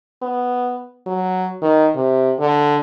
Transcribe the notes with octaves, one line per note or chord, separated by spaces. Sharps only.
B3
F#3
D#3
C3
D3